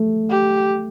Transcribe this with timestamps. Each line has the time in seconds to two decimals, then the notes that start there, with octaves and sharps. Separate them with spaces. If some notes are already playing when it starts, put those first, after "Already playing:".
Already playing: A3
0.30 G4